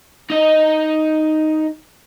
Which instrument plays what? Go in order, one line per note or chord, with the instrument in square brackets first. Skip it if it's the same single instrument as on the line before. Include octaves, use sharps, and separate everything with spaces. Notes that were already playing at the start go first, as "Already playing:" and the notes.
[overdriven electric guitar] D#4 D#5